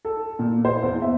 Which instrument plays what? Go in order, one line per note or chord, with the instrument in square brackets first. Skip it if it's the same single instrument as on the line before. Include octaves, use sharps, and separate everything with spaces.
[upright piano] A4
A#2
C5
E2
E5